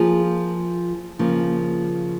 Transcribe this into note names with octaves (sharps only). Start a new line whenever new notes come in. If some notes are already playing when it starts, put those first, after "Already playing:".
Already playing: F3 A#3 F4 G#4
C#3 F3 A#3